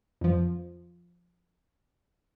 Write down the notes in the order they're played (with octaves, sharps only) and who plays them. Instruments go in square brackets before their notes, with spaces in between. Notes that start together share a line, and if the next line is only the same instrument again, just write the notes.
[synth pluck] F2 F3